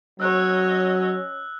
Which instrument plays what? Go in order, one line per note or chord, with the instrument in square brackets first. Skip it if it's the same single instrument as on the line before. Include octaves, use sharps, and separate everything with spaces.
[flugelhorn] F#3 [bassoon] C#4 [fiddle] C#5 D#5 [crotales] E6 F#6